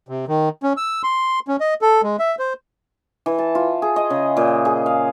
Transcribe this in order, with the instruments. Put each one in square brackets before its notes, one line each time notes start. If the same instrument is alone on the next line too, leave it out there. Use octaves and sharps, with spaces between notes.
[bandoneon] C3
D#3
C#4
E6
C6
C#4
D#5
A4
G#3
E5
C5
[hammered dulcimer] E3
A5
F4
G#4
D#5
C#3
A#2
G#4
F5